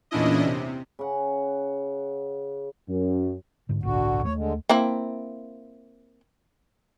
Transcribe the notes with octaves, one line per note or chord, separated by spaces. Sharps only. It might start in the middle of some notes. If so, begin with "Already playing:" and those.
E2 A#2 C#4 D4 E4 D#5
C3
C#3 F#5
F#2
G#2 D3
G1 C2 A2 D3 F#4
D#2 G3 A3 C#5
D3 G#3
A#3 C4 E4